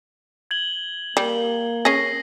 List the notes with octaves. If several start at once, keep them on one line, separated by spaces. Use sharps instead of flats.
G#6 F#7 G7
G3 A#3
C#4 G#4 A#6 C7